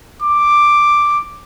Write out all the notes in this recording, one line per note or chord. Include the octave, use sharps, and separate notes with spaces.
D6